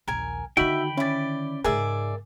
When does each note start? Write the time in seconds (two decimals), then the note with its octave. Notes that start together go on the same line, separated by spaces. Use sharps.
0.08 A#1 D#2 A#4 G#5
0.57 D3 D#3 D#4 F#4 E5 G5 B5 G6
0.97 C#4 E4 D5 A6
1.64 G#2 C#3 G#4 A#4 D5 E5